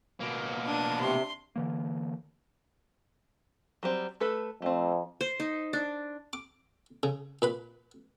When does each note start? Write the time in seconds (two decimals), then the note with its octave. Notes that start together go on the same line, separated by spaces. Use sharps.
0.21 B2 A#3
0.66 D4 D#7
1.00 C3 C6
1.56 D3 E3 A#3
3.83 F#3 G3 C4
4.20 A3 A4 B4
4.62 F2 A3 C4
5.21 C5
5.40 D#4
5.73 D4
6.33 D6
7.03 C#3
7.42 A#2 B4 B5